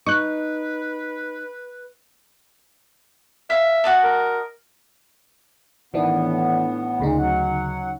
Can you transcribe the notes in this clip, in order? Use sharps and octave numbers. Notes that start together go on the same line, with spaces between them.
D#4 B4 C#6 F#6
E5 F5
F#4 D#5 A5
A#4
A2 D#3 E3 B3 D4
D2 A#2 C#3 D#4
F#3 F#5